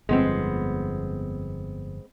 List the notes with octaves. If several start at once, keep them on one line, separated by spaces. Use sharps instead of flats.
G1 F2 G#3 B3 C4